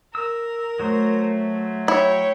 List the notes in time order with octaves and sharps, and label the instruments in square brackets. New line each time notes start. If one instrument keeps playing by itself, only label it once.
[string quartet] A#4 [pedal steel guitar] E6
[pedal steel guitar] F#3 F#4 C5 [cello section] A3
[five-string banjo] E4 [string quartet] C#5 G5